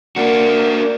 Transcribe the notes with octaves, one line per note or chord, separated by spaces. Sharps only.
A#3 D4 F#4